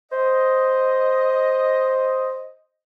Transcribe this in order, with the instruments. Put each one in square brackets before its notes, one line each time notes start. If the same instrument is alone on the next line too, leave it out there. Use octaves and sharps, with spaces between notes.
[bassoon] C5 [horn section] D#5